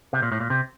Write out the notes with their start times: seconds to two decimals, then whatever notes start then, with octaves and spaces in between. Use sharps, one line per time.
0.13 C3
0.22 A#2
0.32 A2
0.40 A#2
0.50 C3